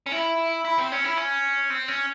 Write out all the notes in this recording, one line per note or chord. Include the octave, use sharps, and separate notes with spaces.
C#4
E4
E4
C4
C#4
E4
C#4
C4
C#4